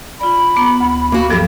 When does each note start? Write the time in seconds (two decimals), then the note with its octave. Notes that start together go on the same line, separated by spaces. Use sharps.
0.21 F4 D5 B5
0.56 B3 A#5 D6
0.80 D2
1.12 A#3 F#4
1.30 G2 F3 F#3 G4 A4 G5